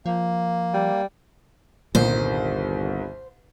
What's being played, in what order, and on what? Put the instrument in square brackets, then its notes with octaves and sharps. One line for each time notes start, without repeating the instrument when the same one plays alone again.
[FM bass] F3 [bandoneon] A#3
[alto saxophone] G3
[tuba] G1 [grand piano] C2 D#3 [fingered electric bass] A#2 [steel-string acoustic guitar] C5